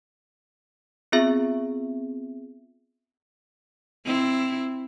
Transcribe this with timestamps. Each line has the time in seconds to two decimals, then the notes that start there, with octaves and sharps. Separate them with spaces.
1.12 B3 C4 F4 G#4 E5
4.05 C4 E4